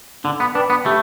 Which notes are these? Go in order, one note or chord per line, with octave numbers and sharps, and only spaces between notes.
D3 D4
B3
D4 B4 G5 B5
B3
A3 G4